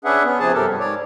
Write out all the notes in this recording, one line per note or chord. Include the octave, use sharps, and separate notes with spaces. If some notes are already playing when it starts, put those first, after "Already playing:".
C#4 D4 G#4 B4 E5 F#5
B3 C#4
C3 F3 G#4 A5
G2 G4 A4 A#4
G2
G#2 C#5 D5